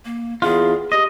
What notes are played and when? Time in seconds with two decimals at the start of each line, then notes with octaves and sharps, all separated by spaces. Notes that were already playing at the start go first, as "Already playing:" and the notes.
0.05 A#3
0.42 E2 F4 G#4
0.92 G4 D#5